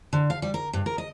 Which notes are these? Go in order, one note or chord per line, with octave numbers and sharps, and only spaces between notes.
D3
F5
G3
A#4
G2
A#4
D#5